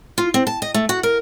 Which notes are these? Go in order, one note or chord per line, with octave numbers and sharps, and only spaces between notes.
F4
C4
A5
D#5
A3
F#4
A#4